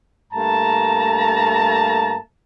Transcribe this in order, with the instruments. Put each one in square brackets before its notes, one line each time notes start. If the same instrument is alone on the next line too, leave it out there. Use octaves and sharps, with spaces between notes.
[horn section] G2 A3 A#3 A5 A#5